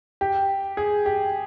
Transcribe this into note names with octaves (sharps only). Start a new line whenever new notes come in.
G4
G#4
G4